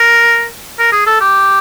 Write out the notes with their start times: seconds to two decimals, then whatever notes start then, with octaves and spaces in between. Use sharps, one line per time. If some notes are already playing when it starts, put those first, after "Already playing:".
Already playing: A#4
0.79 A#4
0.92 G#4
1.07 A4
1.21 G4